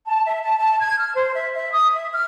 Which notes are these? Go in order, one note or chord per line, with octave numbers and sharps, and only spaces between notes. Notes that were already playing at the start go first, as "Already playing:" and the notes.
A5
E5
A5
A5
G#6
F6
C5
E5
E5
D#6
E5
F6